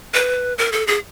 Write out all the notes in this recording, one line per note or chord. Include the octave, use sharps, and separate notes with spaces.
B4
A#4
A4
G#4